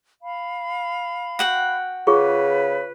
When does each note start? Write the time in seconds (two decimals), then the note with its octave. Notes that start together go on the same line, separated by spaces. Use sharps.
0.22 F5 B5
1.39 F#4 F#5 G5
2.07 C#3 F4 G#4 B4 C#6